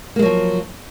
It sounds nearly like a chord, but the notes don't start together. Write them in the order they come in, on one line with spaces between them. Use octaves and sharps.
A#3 G#3 F#3 F3